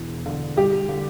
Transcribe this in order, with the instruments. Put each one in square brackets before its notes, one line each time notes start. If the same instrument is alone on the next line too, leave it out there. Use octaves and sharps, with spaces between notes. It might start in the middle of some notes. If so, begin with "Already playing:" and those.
Already playing: [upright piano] E1 E2
D3
G3 G4
D3